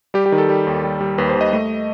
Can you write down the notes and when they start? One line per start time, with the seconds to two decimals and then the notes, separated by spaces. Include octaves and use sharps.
0.14 G3 G4
0.26 G4
0.32 D#3
0.38 A4
0.49 G3
0.67 D#2
0.84 G3
1.01 G3
1.18 D#2 B4
1.29 C5
1.35 D#2
1.41 D#5
1.53 A3